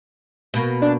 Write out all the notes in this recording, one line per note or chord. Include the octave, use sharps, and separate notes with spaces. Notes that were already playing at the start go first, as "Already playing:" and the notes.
B2 A#3
D4